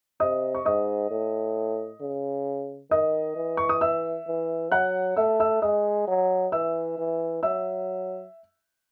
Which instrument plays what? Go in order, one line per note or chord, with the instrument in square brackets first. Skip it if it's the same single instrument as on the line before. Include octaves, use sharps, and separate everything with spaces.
[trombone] C3 [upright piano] D#5 D#6
[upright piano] C#6
[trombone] G#2 [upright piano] D#5 D#6
[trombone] A2
C#3
[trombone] D#3 [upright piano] D#5 D#6
[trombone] E3
[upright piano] C#6
D#6
E5 E6
[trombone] E3
[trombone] F#3 [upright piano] F#5 F#6
[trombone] A3 [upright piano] E5 E6
[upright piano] E5 E6
[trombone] G#3 [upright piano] D#5 D#6
[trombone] F#3
[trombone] E3 [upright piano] E5 E6
[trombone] E3
[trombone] F#3 [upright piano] E5 E6